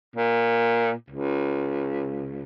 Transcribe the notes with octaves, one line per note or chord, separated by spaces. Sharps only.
A#2
C#2